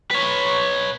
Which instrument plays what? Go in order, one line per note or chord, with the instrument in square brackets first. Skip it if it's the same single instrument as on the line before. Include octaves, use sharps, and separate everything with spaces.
[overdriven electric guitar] B4 C#5